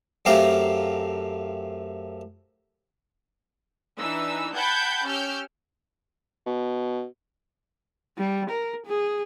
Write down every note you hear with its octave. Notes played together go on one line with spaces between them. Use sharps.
F#2 A3 C4 G4 F5 A#5
E3 D4 D#4 E6
F#5 G5 A5 B5 G6 G#6
C#4 G4 E6 F6 G6
B2
G3
A#4
G#4